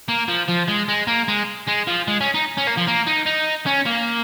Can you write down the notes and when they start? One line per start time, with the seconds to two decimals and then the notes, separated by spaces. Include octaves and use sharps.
0.08 A#3
0.28 F3
0.48 F3
0.68 G#3
0.88 G#3
1.07 A#3
1.28 G#3
1.67 G#3
1.87 F3
2.08 G#3
2.21 C#4
2.34 D#4
2.57 C#4
2.67 A#3
2.77 F3
2.87 A#3
3.07 D#4
3.26 D#4
3.66 C#4
3.86 A#3